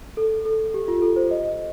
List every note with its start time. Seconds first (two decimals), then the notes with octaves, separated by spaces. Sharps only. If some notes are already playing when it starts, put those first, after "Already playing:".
0.17 A4
0.45 A4
0.74 G4
0.88 F4
1.02 A4
1.16 C5
1.31 D#5